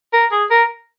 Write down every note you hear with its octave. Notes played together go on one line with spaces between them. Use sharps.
A#4
G#4
A#4